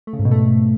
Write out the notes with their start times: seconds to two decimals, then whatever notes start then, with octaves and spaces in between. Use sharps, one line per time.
0.07 A3
0.13 C#3
0.19 G#2
0.25 B2
0.31 A3